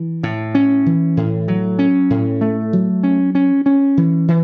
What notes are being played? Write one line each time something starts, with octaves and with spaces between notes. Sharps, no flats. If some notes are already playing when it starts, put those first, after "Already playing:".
Already playing: E3
A2
C#4
E3
A2
F#3
C#4
A2
A3
F#3
C#4
C#4
C#4
E3
E3